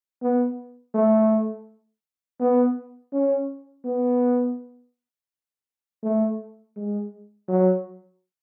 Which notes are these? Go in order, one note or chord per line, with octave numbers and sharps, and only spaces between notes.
B3
A3
B3
C#4
B3
A3
G#3
F#3